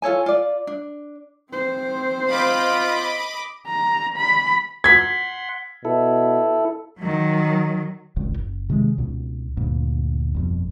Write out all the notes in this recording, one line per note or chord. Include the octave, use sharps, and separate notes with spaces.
F4 A4 C#5 G#5
F4 D5
D4
C4 C5
F4 D#5 B5 D6
A#5
B5
F#5 C6 G#6 B6
B2 E4 A4
D#3 F#3
D#1 G#1 C#2
F#1
C3 D#3 F3 G#3
C#2 B2
D2 G2 A#2
G1 F2 B2